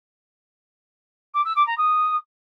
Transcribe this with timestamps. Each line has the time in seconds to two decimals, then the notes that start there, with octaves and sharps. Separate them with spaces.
1.34 D6
1.45 E6
1.56 D6
1.67 A#5
1.78 D#6